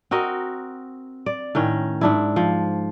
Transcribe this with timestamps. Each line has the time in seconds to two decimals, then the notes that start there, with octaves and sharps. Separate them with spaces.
0.11 C4 F#4 A#4 D#5
1.26 D5
1.55 A2 D#3 C#4
2.01 G#2 D4 E4
2.36 F3